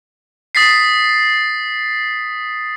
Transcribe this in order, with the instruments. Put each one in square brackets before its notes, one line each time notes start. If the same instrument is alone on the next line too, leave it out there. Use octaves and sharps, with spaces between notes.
[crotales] D#6 A6 B6 C7